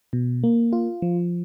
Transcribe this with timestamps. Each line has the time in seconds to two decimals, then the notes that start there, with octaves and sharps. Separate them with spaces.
0.13 B2
0.43 A#3
0.73 F4
1.02 F3